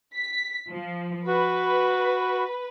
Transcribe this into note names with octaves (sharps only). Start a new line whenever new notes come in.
B6
F3
F#4 B4